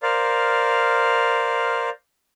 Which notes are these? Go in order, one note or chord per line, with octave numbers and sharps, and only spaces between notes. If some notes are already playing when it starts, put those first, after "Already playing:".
A#4 C5 D5 F5